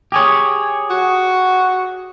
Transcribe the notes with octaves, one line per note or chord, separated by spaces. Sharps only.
G4 G#4 C#5
F#4